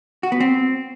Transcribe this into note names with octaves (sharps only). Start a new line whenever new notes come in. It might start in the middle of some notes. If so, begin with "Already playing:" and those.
F#4
B3
C4